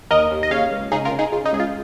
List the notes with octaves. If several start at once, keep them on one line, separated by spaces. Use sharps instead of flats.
D#2 A#4 D#5
D#2
D#5
C#3 C#5 F5
C#2
C#3 D#4 G#4
F4 A#4
C#3
D#4 G#4
C#3 F4
D#4
C#2 G#4
F4